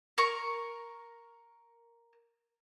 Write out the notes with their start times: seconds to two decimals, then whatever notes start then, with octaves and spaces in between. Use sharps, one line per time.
0.18 A#4 A#5 C#6